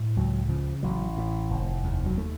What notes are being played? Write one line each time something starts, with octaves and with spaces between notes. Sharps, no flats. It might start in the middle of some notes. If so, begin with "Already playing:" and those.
Already playing: A2
C#2 F#3
C#3 F3
A1 F#3
A2
F1
D#2
F#3
A3